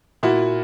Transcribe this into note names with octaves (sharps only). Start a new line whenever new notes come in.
A#2 E4 F#4